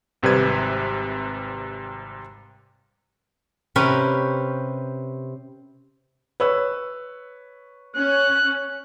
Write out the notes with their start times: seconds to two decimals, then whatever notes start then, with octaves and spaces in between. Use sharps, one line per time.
0.23 G#1 C3 G3 B4 G#6
3.76 C3 C#4 G4 A#4 B4
6.40 B4 C#5 E6
7.96 C#4 F#6